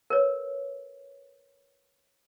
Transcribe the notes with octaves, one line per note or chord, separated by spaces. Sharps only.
A#4 B4 C#5